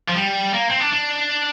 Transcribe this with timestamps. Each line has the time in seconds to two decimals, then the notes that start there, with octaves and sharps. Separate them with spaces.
0.08 F3
0.15 G3
0.53 A#3
0.70 C4
0.80 D4
0.93 D4